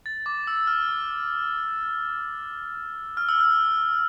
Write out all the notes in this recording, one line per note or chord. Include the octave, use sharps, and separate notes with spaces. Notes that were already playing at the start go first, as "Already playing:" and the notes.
A6
D6
E6
F6
F6
E6
F6